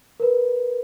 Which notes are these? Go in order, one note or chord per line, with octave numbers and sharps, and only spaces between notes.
A#4 B4